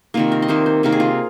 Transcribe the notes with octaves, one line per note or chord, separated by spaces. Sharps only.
C3 D#3 A#3 F4
A#4
D#5
C3 D#3 A#3 C5
C5
C3 D#3 A#3 A#4
G#4
F4